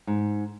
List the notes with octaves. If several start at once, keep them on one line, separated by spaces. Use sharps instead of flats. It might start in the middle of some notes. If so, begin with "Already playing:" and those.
G#2